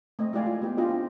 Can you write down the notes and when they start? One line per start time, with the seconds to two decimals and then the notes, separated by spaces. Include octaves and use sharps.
0.19 A3 C4 D#5
0.33 G#3 E4 G4 D5 F5 G#5
0.46 F4
0.62 B3 G4
0.77 D4 E4 F4 G4 G#4 D#5
0.89 C4